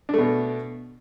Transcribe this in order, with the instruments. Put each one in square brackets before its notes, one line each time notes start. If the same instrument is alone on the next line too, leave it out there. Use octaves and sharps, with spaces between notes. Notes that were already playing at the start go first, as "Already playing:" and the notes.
[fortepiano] D4
A3
B2